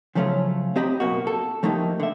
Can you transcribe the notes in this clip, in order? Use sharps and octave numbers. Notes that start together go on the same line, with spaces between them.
C#3 F3 F#3 A3 C#4 F4
C4 G4 D#5 A#5 B5
F#2 B2 A#3 F#4
A4
F3 A3 A#3 D#4 G4
D3 E5